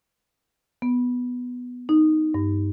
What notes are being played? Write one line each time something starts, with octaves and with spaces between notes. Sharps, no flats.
B3
D#4
G2